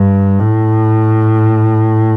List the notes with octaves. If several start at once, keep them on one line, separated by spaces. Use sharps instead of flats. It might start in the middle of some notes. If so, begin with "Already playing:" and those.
Already playing: G2
A2